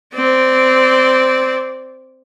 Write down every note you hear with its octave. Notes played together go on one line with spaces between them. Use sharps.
C4 D5